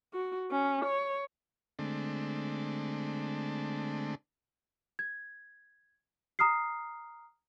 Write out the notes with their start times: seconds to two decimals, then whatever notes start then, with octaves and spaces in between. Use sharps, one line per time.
0.13 F#4
0.51 C#4
0.85 C#5
1.79 D3 G#3 A3 C4 D4
4.99 G#6
6.39 A#5 D#6 F6 C7